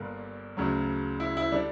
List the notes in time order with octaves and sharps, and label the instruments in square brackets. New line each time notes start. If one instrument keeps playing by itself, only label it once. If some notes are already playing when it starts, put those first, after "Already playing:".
Already playing: [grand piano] G1 G2 D3 A#3
D2 C#3 F#3
E4
E4
D3 G3 D4